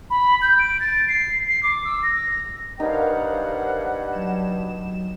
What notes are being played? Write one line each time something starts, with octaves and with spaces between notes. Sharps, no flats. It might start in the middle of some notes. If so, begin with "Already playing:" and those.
B5
G6
D7
A6
C7
C7
D6
E6
A#6
G2 D#4 A#4 C5 F5 F#5
F#3 E7